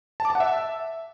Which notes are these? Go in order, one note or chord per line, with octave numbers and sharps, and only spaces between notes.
A5
D6
A5
F#5
E5